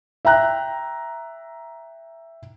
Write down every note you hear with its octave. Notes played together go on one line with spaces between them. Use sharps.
E5 G5 A#5 F#6